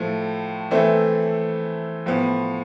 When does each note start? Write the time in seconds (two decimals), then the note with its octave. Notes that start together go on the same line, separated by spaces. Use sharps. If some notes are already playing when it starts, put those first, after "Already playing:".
Already playing: A2 F3 A3
0.71 E3 A3 C4 E4 A4
2.06 A2 F3 B3